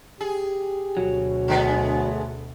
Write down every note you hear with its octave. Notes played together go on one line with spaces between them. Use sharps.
G4 G#4
D2 B2 F#3
D3 G#3 A3 B3